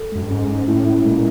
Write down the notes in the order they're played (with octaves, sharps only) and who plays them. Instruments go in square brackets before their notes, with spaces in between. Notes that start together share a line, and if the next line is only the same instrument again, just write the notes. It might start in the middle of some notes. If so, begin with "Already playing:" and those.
Already playing: [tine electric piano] A4
[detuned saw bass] F#2 [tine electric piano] G#3
[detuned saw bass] G2
[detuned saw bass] G#2 [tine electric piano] C#4
[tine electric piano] C#4
[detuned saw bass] A2 [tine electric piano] E4
[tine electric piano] E4
[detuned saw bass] A#2 [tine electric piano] G#3